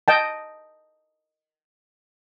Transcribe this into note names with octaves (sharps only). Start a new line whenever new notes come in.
D#5 G5 A5